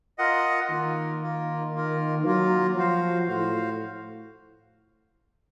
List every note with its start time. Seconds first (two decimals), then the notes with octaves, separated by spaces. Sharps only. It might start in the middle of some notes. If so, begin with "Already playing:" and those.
0.18 F4 A#4 D#5 F#5
0.70 D#3 A#3 F4 A#4
1.22 A#3 F4 A#4
1.74 A#3 F4 A#4
2.25 F#3 A#3 F4 A#4
2.76 F3 F#4 C5 F5
3.29 A2 F#4 C5 F5